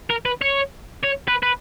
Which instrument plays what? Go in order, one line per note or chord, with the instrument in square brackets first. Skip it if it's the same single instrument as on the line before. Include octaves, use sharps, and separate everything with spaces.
[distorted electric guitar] A#4
B4
C#5
C#5
B4
B4